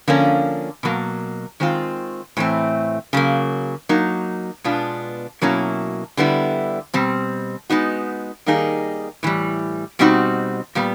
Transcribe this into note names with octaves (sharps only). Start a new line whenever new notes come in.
D3 F3 A#3 C#4
B2 F#3 A#3
D#3 G#3 C4 F4
A2 E3 A3 C4
C#3 F#3 A#3
F#3 A#3 D#4
B2 G#3 B3 D4 F4
B2 F#3 A#3 C#4 E4
D3 G3 B3 E4
B2 G3 C4
G#3 B3 D#4 F#4
D#3 G3 A#3 D#4 G#4
A2 E3 G3
B2 G3 C4 D#4 F#4
A#2 G3 B3